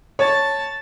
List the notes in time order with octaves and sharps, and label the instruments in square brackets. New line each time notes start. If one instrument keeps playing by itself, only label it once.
[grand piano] C#5 [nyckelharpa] A5